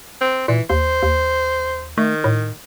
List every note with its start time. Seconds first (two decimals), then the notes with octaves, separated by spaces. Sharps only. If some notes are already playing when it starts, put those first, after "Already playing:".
0.21 C4
0.48 A#2 E3
0.70 D#2 C5
1.03 D#2
1.98 D#3 A3
2.24 A2